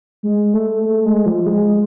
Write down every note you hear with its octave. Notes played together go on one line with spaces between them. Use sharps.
G#3
A3
A3
G#3
F3
G#3